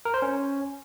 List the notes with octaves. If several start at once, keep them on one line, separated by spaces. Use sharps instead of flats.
A#4
C5
C#4